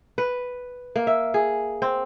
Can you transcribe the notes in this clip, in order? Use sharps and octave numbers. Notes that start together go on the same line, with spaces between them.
B4
A#3
E5
G#4
C4